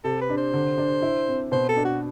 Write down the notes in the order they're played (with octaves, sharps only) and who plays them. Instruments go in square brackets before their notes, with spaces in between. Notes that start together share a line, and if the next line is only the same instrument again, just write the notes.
[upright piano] C3 [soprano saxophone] A4
[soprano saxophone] B4
[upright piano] D4
[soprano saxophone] C5
[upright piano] D3
D4
E4
C4
[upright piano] B2 [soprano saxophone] C5
[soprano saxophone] A4
[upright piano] D4
[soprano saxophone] F#4